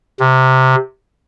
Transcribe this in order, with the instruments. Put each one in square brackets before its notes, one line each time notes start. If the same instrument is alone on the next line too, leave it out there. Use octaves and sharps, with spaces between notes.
[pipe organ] C3